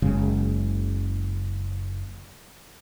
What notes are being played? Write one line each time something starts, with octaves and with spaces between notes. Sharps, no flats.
F#1 C#3 G#3